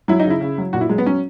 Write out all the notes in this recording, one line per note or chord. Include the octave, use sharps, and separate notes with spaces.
F#3 E4
D#4
C#3
E4
C#3
F#3
A#2 F#4
E4
F#3 G#3
B3
F#3 C#4